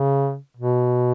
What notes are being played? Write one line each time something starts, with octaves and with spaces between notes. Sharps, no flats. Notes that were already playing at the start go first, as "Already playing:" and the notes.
Already playing: C#3
B2